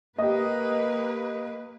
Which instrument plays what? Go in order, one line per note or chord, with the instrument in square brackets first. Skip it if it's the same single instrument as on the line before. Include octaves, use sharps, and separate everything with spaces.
[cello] A#3 B4 [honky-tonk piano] G4 D#5